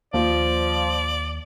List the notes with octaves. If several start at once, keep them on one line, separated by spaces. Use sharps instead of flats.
D#2 F3 D5